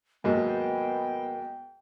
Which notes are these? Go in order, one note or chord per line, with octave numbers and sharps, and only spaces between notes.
D#2 G#2 F#3 B3 A#4 D#5 G5